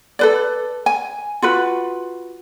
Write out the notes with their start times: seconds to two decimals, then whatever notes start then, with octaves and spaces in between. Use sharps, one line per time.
0.19 A4 B4 D5
0.86 G#5
1.42 F4 F#4 B4